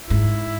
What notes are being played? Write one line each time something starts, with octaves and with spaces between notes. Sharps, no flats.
G#2 E4